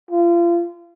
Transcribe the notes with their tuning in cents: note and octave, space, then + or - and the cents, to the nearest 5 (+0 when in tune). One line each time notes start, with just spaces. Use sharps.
F4 -30